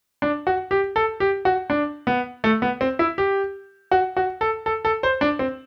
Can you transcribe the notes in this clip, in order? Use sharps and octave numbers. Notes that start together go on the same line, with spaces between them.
D4
F#4
G4
A4
G4
F#4
D4
B3
A3
B3
C4
E4
G4
F#4
F#4
A4
A4
A4
C5
D4
C4